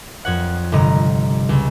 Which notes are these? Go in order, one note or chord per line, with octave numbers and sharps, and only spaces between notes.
F2 C#5 F#5
G1 C3 D#5 A#5
C#2